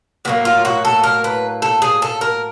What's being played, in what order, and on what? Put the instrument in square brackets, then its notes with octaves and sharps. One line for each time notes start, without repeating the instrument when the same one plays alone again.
[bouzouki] A2 F#3 A#3 B3
F4
F#4
A4
A#4
B4
A4
G#4
A4
A#4